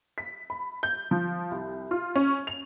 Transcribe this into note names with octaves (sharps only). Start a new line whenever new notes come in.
B6
B5
G6
F3
C2
F4
C#4
F7